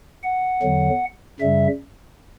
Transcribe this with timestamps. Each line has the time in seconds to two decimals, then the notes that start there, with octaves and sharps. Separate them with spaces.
0.24 F#5
0.62 E2 D3 F#3
1.40 F#2 C#3 G3 E5